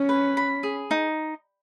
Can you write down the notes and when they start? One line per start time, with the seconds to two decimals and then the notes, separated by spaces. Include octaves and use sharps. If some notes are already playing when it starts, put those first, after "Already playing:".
Already playing: C#4
0.09 B4
0.37 B5
0.63 G#4
0.91 D#4